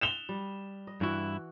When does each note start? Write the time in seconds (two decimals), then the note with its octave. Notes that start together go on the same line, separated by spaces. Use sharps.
0.01 E7 F7 G7
0.29 G3
0.87 D#5
1.01 G2 E3 E4 F#4